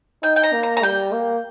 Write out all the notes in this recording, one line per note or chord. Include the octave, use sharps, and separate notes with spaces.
D#4 G5
G5
A#5
A#3
A#5
A#5
G3 G5
A#3